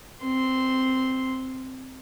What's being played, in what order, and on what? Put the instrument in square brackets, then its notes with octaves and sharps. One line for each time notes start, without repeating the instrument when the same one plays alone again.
[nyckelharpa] C4 C6